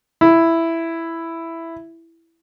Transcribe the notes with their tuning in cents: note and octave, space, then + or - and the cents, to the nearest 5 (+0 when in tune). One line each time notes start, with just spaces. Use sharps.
E4 +5